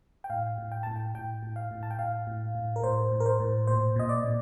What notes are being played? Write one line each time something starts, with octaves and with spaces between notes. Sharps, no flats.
G5
A2 F5
A2
G5
A2 A5
G5
A2 G5
A2
F5
A2
A5
G5
A2 F5
A2
A2
A#4
A2 C5
A2
A#4
C5
A2
A#2 C5
A#2 D#5
D5
A#2